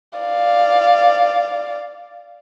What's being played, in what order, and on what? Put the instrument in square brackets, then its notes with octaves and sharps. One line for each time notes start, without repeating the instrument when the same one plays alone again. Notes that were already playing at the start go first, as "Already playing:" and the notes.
[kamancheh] D5 F5